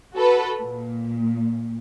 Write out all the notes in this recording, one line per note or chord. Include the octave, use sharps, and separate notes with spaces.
F#4 A4 B4
A#2